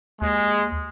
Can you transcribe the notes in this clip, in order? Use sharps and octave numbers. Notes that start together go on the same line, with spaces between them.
D#2 G#3